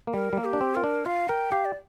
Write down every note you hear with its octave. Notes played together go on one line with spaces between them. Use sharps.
A#3
G3 A#4
G3
A#3
G4
D4
C4
F4 A#4
D4
F4 F5
A#4 G5
G4 F5
D5